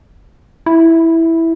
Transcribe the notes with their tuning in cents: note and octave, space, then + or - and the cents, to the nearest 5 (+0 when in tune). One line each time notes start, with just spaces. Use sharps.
E4 -5